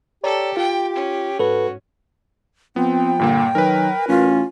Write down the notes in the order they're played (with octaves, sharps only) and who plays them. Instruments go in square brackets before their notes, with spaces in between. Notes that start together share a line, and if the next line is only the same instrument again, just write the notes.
[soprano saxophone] G4 [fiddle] A4 [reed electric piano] C#5 D5 A#5
[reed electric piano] F4 [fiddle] G5
[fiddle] C#4
[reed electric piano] G#2 [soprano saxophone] F#4 [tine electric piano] A4 B4
[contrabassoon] F3 [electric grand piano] B3 [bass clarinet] C4 [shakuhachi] G5
[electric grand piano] G2 A#2 A#3 [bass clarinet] D3
[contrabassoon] D#3 [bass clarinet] F#3 [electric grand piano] A#4 B4
[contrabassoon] A1 [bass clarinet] C#4 [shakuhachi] F4